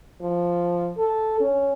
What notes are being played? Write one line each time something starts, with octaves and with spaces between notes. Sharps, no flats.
F3
A4
C#4